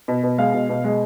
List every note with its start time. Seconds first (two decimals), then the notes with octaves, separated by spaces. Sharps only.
0.08 B2
0.24 B2
0.38 G#3 F5
0.54 B2
0.69 B2
0.84 G#3